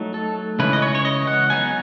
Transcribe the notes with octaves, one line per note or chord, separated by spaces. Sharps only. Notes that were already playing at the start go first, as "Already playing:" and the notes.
Already playing: F#3 A3 D#4
A4
C#3 E3 G#3 C#4 E4 B4
D#5
C#5
C#5
D#5
F#5
F#3 B3 D#4 G#5